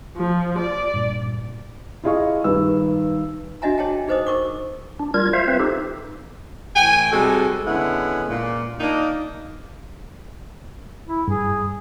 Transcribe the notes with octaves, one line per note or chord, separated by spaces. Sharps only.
F3
D5
G2 A#2
E4 F4 G#4 D#5 F5 C#6
G2 D#3 B4 E6
D4 F#4 D#5 E5 G#5 A#5
G#4 C#5 D#5 G5 A5
D#4 G#4 B4 C5 D#5 D#6
A#4 C#6 D6
D4
G3 F4 A#4 G#6
F4 C5 E5 F5
C4 B4 C5 E5
D#4 G4 A4
A2 E3 G5 G#5
C3 G3 G#3 F#4 A4
D3 G#3 B3 C#4 E4 F#5
A#2
A#3 D4 D#4
E4
G2 G#4